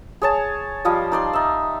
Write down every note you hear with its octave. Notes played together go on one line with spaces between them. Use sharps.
G#4 C#5 A5
F3 G3 F4 D#5
D#4 D5 C6
D#4 E5